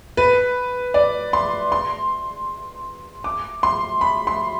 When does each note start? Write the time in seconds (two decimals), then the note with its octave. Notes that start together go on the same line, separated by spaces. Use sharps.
0.17 B4
0.94 D5
1.33 C6
1.72 C6
3.24 D6
3.63 C6
4.01 B5
4.27 C6